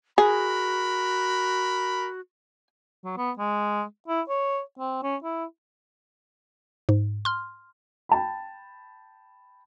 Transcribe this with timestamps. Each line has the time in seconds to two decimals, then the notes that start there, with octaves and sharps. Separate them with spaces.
0.18 F#4 G#4 A#4 B5
3.04 F#3
3.17 B3
3.38 G#3
4.08 E4
4.29 C#5
4.79 C4
5.03 C#4
5.23 E4
6.89 G#2
7.25 C6 F6
8.09 G5 A5 B5